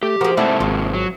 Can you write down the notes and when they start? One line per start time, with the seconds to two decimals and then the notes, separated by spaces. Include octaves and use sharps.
0.03 A3 G4
0.21 F3 F#4 G#4 A#4
0.37 G#2 C3 A3 E4 D5 F#5 A5
0.60 G#1 F4
0.93 F#3